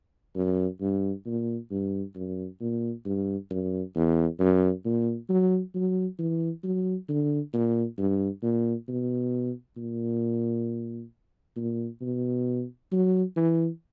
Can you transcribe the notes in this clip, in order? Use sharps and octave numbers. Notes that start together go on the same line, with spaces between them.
F#2
G2
A#2
G2
F#2
A#2
G2
F#2
E2
F#2
A#2
F#3
F#3
E3
F#3
D3
A#2
G2
A#2
B2
A#2
A#2
B2
F#3
E3